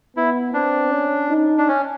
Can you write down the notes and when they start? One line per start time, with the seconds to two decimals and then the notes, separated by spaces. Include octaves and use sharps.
0.17 B3 E4
0.54 C4 D4
0.92 C#4
1.30 D#4
1.58 D4
1.68 C#4